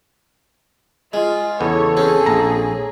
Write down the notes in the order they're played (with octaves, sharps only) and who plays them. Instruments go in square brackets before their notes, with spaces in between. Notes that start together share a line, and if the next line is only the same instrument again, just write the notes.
[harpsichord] G#3 [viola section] F4
[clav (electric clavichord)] E2 C#3 B3 [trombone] A4 [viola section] C#5
[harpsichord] C4 C#4 [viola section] G#4
[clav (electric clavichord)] A#1 A#5